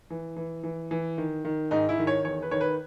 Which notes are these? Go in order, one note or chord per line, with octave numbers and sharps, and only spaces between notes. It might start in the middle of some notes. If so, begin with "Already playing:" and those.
E3
E3
E3
E3
D#3
D#3
G#2 D#4
E4
D#3
C#5
E2 C#5
B4
D#3 C#5
B4